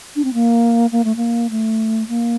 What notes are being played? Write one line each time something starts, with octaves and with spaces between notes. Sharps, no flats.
D4
C4
A#3
A#3
A3
A#3
A3
A#3